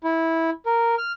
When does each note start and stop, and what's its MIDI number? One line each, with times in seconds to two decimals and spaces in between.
0.04 0.50 64
0.66 0.95 70
0.98 1.12 89